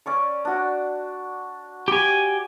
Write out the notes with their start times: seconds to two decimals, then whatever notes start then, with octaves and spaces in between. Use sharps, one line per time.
0.06 C#4 D5 C#6
0.45 D4 F#4
1.88 G4 G#5